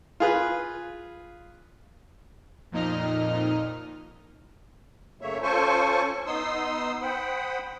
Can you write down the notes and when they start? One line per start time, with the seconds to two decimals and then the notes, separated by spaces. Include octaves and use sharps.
0.20 F4 G#4 B4
2.72 F2 A#2 D#4 D#5 F6
5.21 F#2 C#3 A3 A#3 C#5 E5
5.42 C#4 F4 A4 C5 G#5 C#6
6.26 B3 D#4 C6 D#6 E6
7.02 C5 F#5 G5 B5 D#6